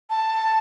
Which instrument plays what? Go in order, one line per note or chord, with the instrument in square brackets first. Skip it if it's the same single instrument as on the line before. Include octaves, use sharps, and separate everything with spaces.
[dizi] A5